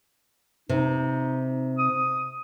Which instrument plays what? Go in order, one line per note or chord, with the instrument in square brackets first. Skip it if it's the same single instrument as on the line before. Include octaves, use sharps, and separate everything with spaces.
[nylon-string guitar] C3 [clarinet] D#4
[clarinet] D#6